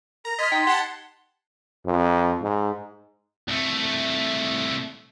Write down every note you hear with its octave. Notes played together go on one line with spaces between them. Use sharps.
A#4 A#5
D#5 C6 F6 G#6 A6 B6
D#4 G5
G4 F#5 A5 C7 G7
F2
G#2
C2 A3